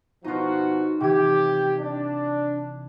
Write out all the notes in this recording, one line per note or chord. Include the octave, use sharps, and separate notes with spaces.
B2 F3 D#4 F4 F#4
C3 E3 G4 G#6
D4